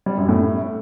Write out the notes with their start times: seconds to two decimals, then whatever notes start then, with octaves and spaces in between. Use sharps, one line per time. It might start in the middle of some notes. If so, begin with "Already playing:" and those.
0.06 G3
0.18 F#2
0.29 A2